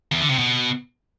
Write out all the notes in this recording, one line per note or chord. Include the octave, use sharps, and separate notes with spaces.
E2
D3
C3
B2